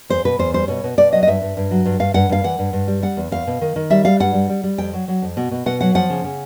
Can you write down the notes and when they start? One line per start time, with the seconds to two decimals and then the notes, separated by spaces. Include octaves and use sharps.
0.10 E2 C5
0.25 B2 B4
0.39 E2 C5
0.54 G3 C5
0.68 B2 C#5
0.84 B2
0.97 B2 D5
1.12 F#3 D#5
1.23 D#5
1.27 G2 E5
1.42 G2
1.57 G2
1.71 F#3
1.85 G2
2.00 G2 F5
2.14 G2 F#5
2.29 G2 F5
2.44 E3 F#5
2.59 G2
2.73 G2
2.88 G3
3.02 G3 F#5
3.17 E2
3.31 E2 F5
3.47 B2
3.61 D#3
3.76 D#3
3.90 G3 E5
4.05 G3 F5
4.20 G2 F#5
4.34 G3
4.50 G3
4.64 G3
4.78 F2 G5
4.93 F#3
5.08 F#3
5.22 F2
5.37 B2
5.51 B2
5.66 B2 F#5
5.81 F#3 F#5
5.95 F3 F#5
6.10 C#3
6.24 C#3